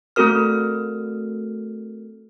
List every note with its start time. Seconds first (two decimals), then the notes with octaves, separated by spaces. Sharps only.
0.16 A3 C4 F#4 A4 A#4 F6